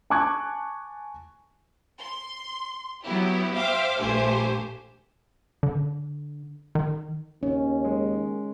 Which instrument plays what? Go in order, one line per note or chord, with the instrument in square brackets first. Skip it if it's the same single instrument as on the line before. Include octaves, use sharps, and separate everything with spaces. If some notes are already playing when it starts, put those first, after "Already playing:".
[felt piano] G#5 A5 C#6 D6 F#6 G#6
[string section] C6
F#3 B3 E4 G4
C5 E5 F5 G5 D6
A#1 G2 A3 G4 C5 G#5
[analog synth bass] D3
D#3
[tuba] D#2 [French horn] D#3 [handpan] C#4
[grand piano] G#3